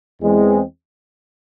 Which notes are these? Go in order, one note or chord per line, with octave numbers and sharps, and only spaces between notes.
E2 E3 G#3 C4